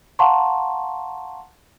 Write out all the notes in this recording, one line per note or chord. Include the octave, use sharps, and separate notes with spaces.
F5 F#5 A5 A#5 C6 C#6